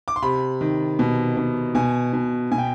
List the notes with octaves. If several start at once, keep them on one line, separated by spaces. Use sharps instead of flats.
D6
C6
C3 B5
D#3
B2
B2
B2 G#5
B2
B2 G#5
G5